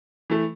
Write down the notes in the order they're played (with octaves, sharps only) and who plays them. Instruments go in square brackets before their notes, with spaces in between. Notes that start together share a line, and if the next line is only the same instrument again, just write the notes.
[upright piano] E3 A3